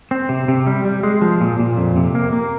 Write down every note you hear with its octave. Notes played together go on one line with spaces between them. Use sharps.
C4
C3
C3
G3
G3
G#3
F3
A#2
A#2
F2
C3
A#3
A#3